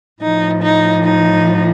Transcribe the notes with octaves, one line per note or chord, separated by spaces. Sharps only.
A2 F3 D#4
D#4
D#4